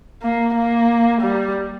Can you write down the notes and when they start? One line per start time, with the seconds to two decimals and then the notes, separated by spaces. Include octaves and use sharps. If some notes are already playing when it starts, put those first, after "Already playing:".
0.22 A#3
0.55 A#3
1.22 G3